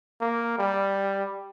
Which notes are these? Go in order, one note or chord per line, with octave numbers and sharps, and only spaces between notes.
A#3
G3